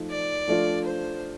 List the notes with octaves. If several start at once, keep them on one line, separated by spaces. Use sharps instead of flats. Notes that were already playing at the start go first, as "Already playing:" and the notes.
Already playing: F3 A3 D#4
D5
F3 A3 D4 F4
C5